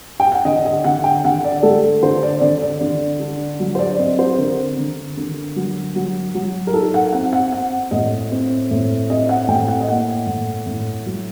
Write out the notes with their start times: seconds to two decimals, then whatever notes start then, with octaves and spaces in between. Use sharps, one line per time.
0.20 G5
0.32 F#5
0.45 D3 D#5
0.65 D#5
0.84 D3 F#5
1.04 G5
1.24 D3 F#5
1.44 D5
1.63 A3 A4
2.03 D3 C5
2.23 D5
2.41 D3 D5
2.62 D5
2.81 D3
3.20 D4
3.60 F#3
3.75 C5
3.79 D5
3.98 C4 D#5
4.19 C5
4.38 D3 A#4
4.78 D3
5.17 D3
5.56 F#3
5.96 F#3
6.34 F#3
6.67 A#4
6.74 D#4 A4
6.94 F#5
7.13 C4 F#5
7.33 F#5
7.52 C4 F#5
7.91 A2 D#5
8.32 C4
8.71 A2
9.10 C4 D#5
9.29 F#5
9.48 A2 G5
9.68 F#5
9.81 D#5
9.88 A#3 F#5
10.27 A2
10.66 A2
11.06 F#3